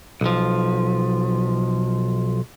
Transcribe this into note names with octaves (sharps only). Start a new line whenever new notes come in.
B1 F3